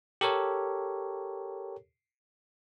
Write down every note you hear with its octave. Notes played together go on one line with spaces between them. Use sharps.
G4 A4 A#4 C#5